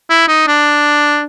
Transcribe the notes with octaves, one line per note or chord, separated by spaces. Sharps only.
E4
D#4
D4